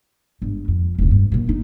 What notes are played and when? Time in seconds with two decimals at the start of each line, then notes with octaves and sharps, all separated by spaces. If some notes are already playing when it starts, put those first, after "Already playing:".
0.42 G1 G#2
0.68 F2
0.98 E1 C#2
1.11 G2
1.32 A#2 F#3
1.47 G1 D#4